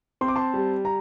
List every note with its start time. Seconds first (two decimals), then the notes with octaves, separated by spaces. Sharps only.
0.21 C4 C6
0.28 D6
0.35 A5 C6
0.54 G3
0.85 A#5